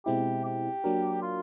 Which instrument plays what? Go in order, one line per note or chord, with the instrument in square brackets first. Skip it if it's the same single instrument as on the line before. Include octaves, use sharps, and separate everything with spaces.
[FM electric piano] B2 G#3 C4 E4 [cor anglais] G4
[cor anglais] G4
[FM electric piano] F#3 A#3 D4 F#4 A#4
[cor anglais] F4